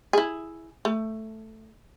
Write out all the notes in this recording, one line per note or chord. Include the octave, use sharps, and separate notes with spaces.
E4 G#4
A3